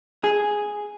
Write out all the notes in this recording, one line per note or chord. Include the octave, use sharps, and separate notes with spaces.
G#4